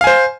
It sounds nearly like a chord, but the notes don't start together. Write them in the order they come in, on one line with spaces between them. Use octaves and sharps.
F5 G#5 C5